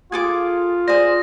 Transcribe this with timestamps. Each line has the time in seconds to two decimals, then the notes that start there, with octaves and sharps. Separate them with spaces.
0.12 F4 G#4 A4 D6 G#6
0.88 G#4 C5 D5 A#6